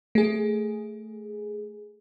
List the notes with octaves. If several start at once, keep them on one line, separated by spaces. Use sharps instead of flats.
A3 G#4